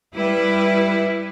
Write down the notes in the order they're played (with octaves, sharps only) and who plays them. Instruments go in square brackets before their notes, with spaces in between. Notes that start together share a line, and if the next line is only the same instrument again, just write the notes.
[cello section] G3 E4 B4